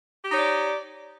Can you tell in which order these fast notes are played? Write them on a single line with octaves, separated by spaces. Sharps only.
G4 D#4 C#5 D5